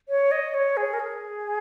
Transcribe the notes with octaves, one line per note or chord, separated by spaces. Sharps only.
C#5
D#5
C#5
G#4
A#4
G#4